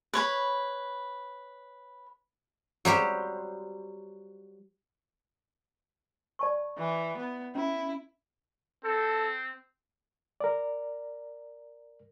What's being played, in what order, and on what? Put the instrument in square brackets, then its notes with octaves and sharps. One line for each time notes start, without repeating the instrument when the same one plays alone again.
[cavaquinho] B4 C#5 B5
[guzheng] F#3 G3 G4 C5
[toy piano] D5 A5 C#6
[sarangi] E3
B3
[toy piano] C#4 [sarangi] E4
[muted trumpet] C4 [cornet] A4
[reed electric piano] A#4 D5